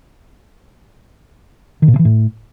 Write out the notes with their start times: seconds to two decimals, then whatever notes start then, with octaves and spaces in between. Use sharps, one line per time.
1.82 D#3
1.88 A#2
1.94 C3
1.99 E3
2.05 A2